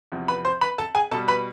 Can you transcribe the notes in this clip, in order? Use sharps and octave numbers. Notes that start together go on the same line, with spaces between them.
E2 C3 F3
B4 B5
C5 C6
B4 B5
A4 A5
G#4 G#5
B2 G3 A4 A5
B4 B5